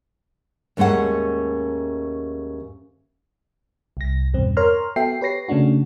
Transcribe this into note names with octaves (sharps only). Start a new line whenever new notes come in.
D#2 G#2 A3 C#4 F#5
C2 A#6
E2 G2 B2 C4
A#4 C#5 A#5 C6 F6
B3 F#4 A4 E5 G5 C7
G4 B4 C#5 A#6 C7
C#3 A3 C#4 D4 F#4